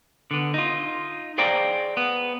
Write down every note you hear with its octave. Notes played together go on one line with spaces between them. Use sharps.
D3 B3
D#4 F4
G#4 C5 D5 F5 G5 A#5
B3